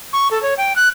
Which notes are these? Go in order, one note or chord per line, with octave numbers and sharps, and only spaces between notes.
C#6
A4
C#5
G5
F#6